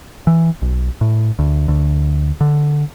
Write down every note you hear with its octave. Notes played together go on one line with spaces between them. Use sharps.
E3
B1
A2
D2
D2
D3